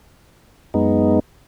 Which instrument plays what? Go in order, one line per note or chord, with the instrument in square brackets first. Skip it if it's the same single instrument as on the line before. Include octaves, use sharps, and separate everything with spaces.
[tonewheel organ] F#2 G#3 B3 D#4